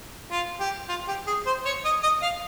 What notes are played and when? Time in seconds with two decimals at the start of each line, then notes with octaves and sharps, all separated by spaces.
0.31 F4
0.60 G4
0.89 F4
1.08 G4
1.27 G#4
1.46 C5
1.65 C#5
1.84 D#5
2.03 D#5
2.22 F5